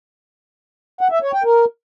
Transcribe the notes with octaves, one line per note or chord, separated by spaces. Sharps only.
F#5
E5
C#5
G5
A#4